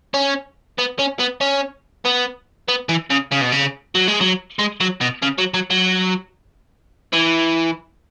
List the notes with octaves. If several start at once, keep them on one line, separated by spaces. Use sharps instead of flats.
C#4
B3
C#4
B3
C#4
B3
B3
E3
C#3
C#3
B2
C#3
F#3
G#3
F#3
G#3
F#3
B2
C#3
F#3
F#3
F#3
E3